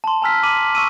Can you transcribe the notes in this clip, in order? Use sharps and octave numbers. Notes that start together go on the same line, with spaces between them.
A5 C6
G#5 A#5 E6 F6 B6
D6 D#7 F#7
C#6 E6 D#7